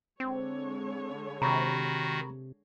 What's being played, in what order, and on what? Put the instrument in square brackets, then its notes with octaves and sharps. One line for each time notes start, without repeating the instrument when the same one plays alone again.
[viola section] D3 G#3 C#5 [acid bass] C4
[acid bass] C3 [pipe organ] D#3 F#4 [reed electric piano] A#5 B5 C#6